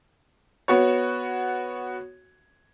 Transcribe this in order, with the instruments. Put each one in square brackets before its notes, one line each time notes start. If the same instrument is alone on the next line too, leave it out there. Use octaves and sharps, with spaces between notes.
[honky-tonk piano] B3 F#4 C#5